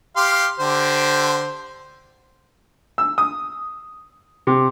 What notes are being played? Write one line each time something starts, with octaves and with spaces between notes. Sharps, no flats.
G4 F5 C6
D3 G4 C5
E6
D#6
C3